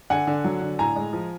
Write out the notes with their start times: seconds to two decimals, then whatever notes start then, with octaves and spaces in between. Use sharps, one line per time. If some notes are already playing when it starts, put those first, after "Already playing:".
0.10 D3 F#5 G#5
0.27 D3
0.45 F#3
0.62 D3
0.79 A2 G#5 A#5
0.96 G#3
1.13 F3